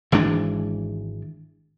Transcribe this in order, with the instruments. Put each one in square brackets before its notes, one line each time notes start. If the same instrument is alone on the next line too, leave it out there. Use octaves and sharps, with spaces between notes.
[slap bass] G#1 E3 G#3 D4